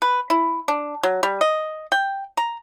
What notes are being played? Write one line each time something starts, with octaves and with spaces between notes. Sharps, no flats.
B4
E4
D4
F#3
G3
D#5
G5
A#5